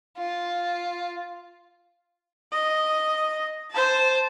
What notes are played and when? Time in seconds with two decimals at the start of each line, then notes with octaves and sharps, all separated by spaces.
0.18 F4
2.53 D#5
3.71 C5 A5